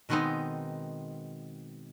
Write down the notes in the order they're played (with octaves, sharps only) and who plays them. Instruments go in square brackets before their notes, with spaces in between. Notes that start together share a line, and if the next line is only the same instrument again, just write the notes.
[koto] B2 D#3 G#3 B3 C4 D#4